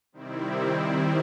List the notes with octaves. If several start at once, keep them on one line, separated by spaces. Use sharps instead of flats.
C3 D#3 G3 C4 E4